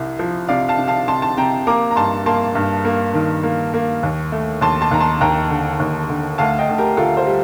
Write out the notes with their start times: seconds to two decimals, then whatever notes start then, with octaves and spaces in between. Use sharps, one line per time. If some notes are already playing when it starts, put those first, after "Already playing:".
Already playing: C2 C3
0.19 F3
0.48 C3 D5 F5
0.68 F5 A5
0.78 C3
0.88 F5 A5
1.08 C3 A5 C6
1.22 A5 C6
1.37 C3 G5 A#5
1.67 A#3 A#5 D6
1.91 A#5
1.96 G2 A5 C6
2.26 A#3 A5 C6
2.55 G2
2.85 A#3
3.14 D#3
3.43 A#3
3.74 A#3
4.03 D#2
4.32 A3
4.61 D#2 A5 C6
4.81 A5 C6
4.91 D#2 A#5
5.01 A5 C6
5.21 D#2 G5 A#5
5.50 D3
5.80 D#2
6.10 D3
6.38 D2 F5 A5
6.59 D#5 G5
6.69 D2
6.78 G4 A#4
6.97 D2 F4 A4
7.17 A4 C5
7.27 G3